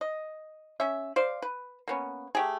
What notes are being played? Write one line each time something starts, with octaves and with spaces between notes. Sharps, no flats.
D#5
C#4 E5
C5 D5 F5
B4
A#3 B3 C#4
A3 G4 G#4